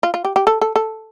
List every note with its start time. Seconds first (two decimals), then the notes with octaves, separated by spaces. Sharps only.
0.03 F4
0.14 F4
0.25 G4
0.36 G4
0.47 A4
0.61 A4
0.76 A4